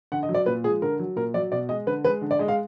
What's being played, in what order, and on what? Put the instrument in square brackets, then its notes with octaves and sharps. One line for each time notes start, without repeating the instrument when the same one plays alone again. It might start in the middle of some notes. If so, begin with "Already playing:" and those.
[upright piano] D3 F#5
D#5
F#3
D5
A#2 B4
F3 G#3 G#4
D3 A#4
F#3
A#2 A#4
F#3 D5
B2 D5
G#3 D#5
D3 B4
G#3 B4
D3
D5
G#3 D#5
F5